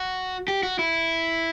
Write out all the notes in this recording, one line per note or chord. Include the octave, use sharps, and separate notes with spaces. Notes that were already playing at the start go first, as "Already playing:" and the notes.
Already playing: F#4
G4
F#4
E4